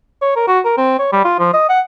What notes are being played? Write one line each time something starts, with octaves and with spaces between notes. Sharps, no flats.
C#5
A#4
F#4
A#4
C4
C#5
G3
F4
F3
D#5
F#5